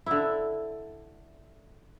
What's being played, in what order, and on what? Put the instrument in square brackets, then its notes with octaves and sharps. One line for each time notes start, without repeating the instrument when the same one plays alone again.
[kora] D3 E4